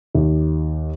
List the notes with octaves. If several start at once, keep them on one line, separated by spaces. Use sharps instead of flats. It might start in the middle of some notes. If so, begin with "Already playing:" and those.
D#2